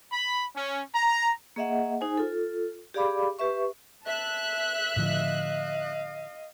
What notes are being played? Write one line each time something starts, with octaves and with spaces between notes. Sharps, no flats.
B5
C#4
A#5
A#3 G#4 D#5 E5 F#5
D#4 G#4 C5 G#5
F4 A4
G4 G#4 D5 F5 B5 D6
G4 B4 E5 C#6
E5 A5 F#6
A2 D3 F3 D#5 F5